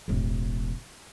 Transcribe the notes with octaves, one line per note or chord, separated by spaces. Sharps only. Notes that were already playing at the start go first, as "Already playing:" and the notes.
E1 A1